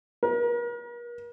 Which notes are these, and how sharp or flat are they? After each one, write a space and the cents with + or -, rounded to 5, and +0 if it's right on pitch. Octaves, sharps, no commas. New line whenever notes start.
A#4 +40